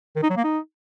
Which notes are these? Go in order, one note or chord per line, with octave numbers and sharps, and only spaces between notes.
D#3
D#4
F#3
A#3
D#4